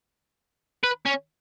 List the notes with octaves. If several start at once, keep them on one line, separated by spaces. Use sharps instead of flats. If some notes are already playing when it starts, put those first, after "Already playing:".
B4
C#4